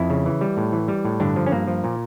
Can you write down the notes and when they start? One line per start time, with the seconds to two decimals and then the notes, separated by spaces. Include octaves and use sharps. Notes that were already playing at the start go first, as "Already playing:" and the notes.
Already playing: F2 E4
0.10 C#3
0.26 E3
0.41 G3
0.57 A2
0.72 E3
0.88 G3
1.05 A2
1.20 G2 D3 D4
1.36 F3
1.46 C#4
1.52 G2 A#3
1.67 F3
1.84 A#2